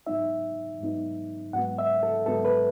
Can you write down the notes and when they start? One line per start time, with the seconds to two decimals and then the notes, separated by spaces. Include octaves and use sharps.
0.07 G#2 F#3 B3 D#4 E5
0.80 G#2 F#3 B3 D#4
1.53 G#2 F#3 B3 F#5
1.78 E5
2.03 A4
2.26 G#2 F#3 B3 A4
2.45 B4